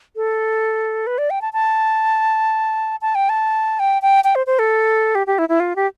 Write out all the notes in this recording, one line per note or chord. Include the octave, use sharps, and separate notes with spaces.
A4
B4
D5
G5
A5
A5
A5
G5
A5
G5
G5
G5
C5
C5
A4
G4
G4
E4
E4
F4
G4